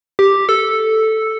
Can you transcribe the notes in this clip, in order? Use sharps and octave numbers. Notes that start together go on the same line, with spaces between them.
G4
A4